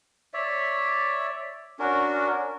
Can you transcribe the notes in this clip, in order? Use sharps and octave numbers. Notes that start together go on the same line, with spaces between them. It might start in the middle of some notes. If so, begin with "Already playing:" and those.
C#5 D5 E5
C#4 D4 F#4 A#4